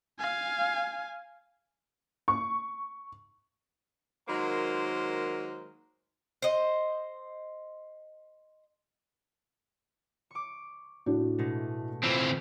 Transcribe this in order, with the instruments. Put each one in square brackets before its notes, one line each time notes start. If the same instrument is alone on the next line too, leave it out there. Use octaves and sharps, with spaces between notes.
[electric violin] F5 G#5
[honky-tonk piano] C#6
[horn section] D#3 F#3 G#3 A#3 C5 A#5
[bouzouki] C5 D#5
[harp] C#6 D6
[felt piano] A2 D4 F#4
[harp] B2 G#3 A3
[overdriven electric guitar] E3 C4 [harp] B3 F4